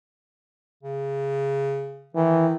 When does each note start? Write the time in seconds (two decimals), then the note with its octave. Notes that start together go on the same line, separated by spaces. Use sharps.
0.83 C#3
2.15 D#3 E3